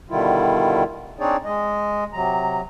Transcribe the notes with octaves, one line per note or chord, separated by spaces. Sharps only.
B2 D3 D#3 G3 E4 F4
C4 D4 D#4 G#4 C#5 D5
G#3 D#5
C3 F#3 A#5